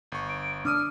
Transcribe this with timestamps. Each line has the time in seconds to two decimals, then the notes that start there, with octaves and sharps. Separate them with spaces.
0.12 G1 C#6
0.29 D7
0.65 D4 D6 D#6 F6 D#7